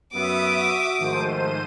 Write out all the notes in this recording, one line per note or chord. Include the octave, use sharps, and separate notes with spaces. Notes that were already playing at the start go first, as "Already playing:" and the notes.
F#2 B3 F#4 E5 D6 D#6
G#2 D#3 F3 A3 C5 D#7